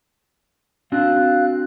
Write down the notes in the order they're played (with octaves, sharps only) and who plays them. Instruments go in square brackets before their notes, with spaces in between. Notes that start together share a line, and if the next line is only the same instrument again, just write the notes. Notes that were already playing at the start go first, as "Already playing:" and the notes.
[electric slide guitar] C4 D4 F#4 [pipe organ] F5 F#6